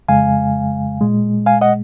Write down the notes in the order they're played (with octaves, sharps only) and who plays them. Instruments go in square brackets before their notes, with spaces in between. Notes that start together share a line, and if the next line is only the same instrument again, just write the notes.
[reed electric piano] F2 C#3 G#3 F5 G#5
A#2 G#3
F5 G#5
D#5 F#5